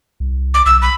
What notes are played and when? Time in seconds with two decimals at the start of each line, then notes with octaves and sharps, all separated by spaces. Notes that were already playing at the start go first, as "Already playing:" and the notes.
0.20 C2
0.54 D6
0.66 B1 E6
0.82 B5